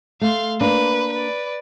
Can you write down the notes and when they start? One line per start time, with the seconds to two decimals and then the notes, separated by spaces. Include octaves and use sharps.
0.21 A3 F5 C6
0.61 A#3 D4 B4
1.13 B4 D5